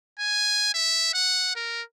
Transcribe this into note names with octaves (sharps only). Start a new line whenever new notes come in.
G#5
E5
F#5
A#4